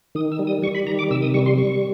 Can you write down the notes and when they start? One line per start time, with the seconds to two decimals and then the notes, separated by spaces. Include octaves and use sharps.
0.15 D#3 D#6
0.32 E6
0.39 G3
0.47 D#6
0.62 G3 C#6
0.75 B5
0.87 D#3 A#5
0.99 D6
1.11 C3 E6
1.22 D#6
1.34 G3 C#6
1.46 C6
1.58 G3 C#6